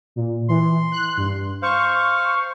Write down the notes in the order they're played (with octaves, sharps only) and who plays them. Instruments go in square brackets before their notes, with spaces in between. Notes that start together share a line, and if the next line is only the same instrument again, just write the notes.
[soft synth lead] A#2
[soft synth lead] E3 [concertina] C6
[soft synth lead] F#6
G2
[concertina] C5 F5 [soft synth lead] C#6